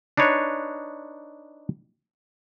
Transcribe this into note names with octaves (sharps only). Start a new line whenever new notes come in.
D4 D#4 B4 C#5